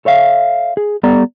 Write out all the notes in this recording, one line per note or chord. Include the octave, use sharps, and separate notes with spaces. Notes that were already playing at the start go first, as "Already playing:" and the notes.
A4 C#5 E5 F5
G#4
G3 B3 A4 D5 A#5